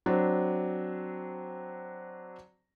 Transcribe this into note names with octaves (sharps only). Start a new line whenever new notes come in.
F#3 C4 D4